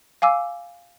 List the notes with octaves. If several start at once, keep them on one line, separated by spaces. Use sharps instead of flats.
F5 G#5 D6 E6